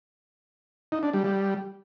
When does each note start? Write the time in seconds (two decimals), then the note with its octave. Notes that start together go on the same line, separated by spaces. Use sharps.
0.92 D#4
1.03 D4
1.14 G3
1.24 G3